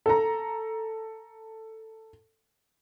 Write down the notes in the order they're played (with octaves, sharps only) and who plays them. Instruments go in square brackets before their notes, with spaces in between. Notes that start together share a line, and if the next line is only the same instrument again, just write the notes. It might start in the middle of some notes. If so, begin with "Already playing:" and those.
[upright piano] A4 A#5